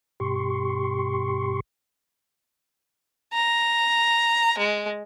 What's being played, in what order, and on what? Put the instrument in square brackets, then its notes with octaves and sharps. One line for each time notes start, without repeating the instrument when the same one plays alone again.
[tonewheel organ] G2 B2 G4 C6 C#6
[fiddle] A#5
G#3